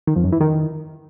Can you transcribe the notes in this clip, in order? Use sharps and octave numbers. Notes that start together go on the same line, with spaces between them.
D#3
F2
F#2
E3
D#3